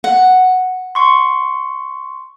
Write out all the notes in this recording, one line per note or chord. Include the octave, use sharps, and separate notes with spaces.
F#5
C6 C#6